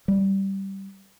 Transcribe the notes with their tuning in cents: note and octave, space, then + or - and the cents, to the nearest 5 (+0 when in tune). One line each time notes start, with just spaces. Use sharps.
G3 -10